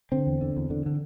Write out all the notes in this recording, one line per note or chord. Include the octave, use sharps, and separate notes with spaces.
D3 C4
E2
D3
E2
D3
D3